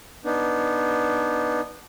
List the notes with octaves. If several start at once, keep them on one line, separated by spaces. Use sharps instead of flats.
B3 D4 D#4